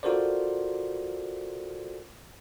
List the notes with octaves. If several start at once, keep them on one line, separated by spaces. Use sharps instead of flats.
F4 F#4 A4 A#4 C5 D5